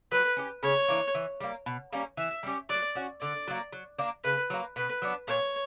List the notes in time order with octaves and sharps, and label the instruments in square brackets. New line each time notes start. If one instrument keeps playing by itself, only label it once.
[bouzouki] F#3 [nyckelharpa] B4
[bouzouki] C#4 G4
[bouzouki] C#3 [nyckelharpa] C#5
[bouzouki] E3 A#3 D4
E3
G3 A#3
B2
G3 A#3 C#4
[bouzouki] E3 [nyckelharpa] E5
[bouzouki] G3 C#4 G4
[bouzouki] F#3 [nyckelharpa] D5
[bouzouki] C#4 F#4
[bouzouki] D3 [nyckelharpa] D5
[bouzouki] F#3 A#3
F#3
A#3 D4
[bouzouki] C#3 [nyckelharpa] B4
[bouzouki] F#3 A#3
[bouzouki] B2 [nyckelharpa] B4
[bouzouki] F#3 B3 D4
[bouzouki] A#2 [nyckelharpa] C#5